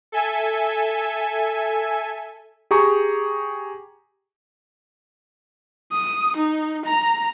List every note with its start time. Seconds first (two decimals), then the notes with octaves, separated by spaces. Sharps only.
0.12 A4 E5 G#5
2.71 G4 G#4 A#5 C#6
5.92 D#6
6.37 D#4
6.85 A#5